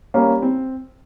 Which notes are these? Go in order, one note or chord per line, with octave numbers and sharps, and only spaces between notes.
G3 A#3 C#4
C4